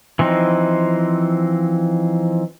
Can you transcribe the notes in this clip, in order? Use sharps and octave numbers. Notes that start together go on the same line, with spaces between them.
E3 F3 C4 D#4